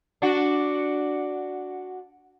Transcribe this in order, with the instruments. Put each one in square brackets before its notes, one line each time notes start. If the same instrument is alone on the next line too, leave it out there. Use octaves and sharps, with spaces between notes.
[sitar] D4 F#4